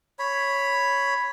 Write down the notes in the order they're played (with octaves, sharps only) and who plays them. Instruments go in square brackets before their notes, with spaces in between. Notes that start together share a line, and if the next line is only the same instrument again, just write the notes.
[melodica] C#5 B5